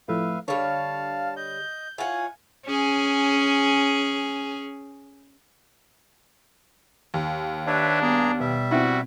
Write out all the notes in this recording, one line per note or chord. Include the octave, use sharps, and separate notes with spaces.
F2 A2 B4 E5 F5
D3 G3 C#5 F5 A5
D#5 G6
E4 F4 C#5 F5 F#5 G#5 A6
C#4 G#4
D#2
D4 B4 C#5 E5
G2 B3 G#4 A#5
B2 G3 E5
C4 E4 F#4